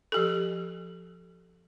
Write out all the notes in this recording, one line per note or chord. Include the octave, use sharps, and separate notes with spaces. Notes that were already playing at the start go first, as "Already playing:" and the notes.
F3 G4 A4